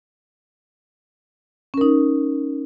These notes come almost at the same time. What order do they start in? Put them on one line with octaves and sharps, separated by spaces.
C#4 A#4 D#4